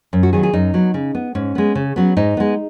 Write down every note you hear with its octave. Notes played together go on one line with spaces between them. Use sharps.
F#2
F#4
D#3 F#3 B3 G#4
G#4
F#2 D#4
F#3 B3
C#3
B3
G#2 C#4
G#3 B3
C#3
F#3 B3
G#2 D#4
G#3 B3